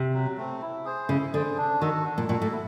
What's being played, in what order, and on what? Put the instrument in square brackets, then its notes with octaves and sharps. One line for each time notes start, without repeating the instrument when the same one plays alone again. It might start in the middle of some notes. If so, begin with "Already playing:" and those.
Already playing: [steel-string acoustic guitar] C3
[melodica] F#3
A3 C4
E4
G#4 C5
[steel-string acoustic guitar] C#3 [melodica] E4
[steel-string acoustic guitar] D3 [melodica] G#4 C5
[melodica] D4
[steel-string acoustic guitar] D#3 [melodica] F#4 A4
[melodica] D4
[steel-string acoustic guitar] A#2
[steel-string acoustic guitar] A#2 [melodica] F#4
[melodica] A4
[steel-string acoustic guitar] A2
[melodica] E4